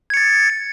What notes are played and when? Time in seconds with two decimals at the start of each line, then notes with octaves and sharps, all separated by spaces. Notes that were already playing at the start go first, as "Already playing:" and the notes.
0.10 G#6
0.14 C#7
0.17 A6